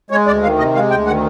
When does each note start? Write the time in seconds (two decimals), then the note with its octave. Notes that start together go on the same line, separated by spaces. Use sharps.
0.11 G#3 C#5
0.26 D2 D5
0.43 D#3 F5
0.58 C3 D#5
0.75 G#3 F5
0.90 D2 G5
1.07 D#3 F#5